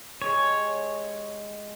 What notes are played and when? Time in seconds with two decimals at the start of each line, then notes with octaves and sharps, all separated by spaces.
0.22 G#3 G4 G#4 C#5